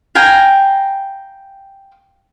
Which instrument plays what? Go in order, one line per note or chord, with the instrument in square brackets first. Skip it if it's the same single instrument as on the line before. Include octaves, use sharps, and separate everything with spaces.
[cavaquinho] F5 G5 G#5 A#5